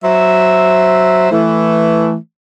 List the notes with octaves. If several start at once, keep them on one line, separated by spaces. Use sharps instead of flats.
F#3 C5 E5
E3 A3